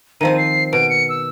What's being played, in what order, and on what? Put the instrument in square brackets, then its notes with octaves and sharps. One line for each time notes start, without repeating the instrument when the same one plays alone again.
[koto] D#3 F3 C4 [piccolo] D#7
[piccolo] C7
[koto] B2 [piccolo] D7
[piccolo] C#7
E6